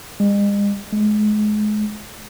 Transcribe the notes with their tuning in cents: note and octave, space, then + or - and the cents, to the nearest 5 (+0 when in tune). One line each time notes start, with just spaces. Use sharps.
G#3 -45
G#3 +30